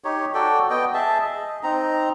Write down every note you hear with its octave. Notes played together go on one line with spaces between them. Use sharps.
D#4 G4 C#5
F#4 A4 D5 G5
B3 D#5 G5
G#4 E5 A5
D#5
C4 D#4 A#5